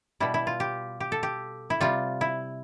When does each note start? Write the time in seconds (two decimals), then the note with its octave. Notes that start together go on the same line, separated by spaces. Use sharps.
0.20 B2 G3 E4
0.34 E4
0.47 F4
0.60 G4
1.00 G4
1.12 A4
1.23 G4
1.70 E4
1.81 C3 G3 F4
2.21 E4